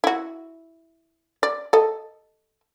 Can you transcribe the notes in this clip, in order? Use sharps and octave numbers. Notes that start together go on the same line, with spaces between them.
E4 F#4
D5
A4 D#5